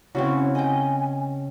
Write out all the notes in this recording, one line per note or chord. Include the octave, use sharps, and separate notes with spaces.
C#3 C4 C#4 E4 F#4
D#5 G5 G#5